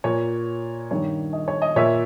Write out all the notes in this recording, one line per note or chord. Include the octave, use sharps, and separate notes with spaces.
A#2 C#5
G2 D#3 C#5
D#5
C#5
D#5
A#2 C#5 E5